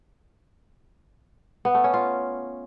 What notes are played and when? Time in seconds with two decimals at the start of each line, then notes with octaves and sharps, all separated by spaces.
1.65 B3
1.75 A3
1.84 C#4
1.94 F4